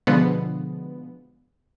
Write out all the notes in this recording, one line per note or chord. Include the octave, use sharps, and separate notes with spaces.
B2 D3 F3 G#3 B3